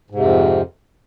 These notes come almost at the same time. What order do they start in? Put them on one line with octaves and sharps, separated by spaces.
G#2 C3 F2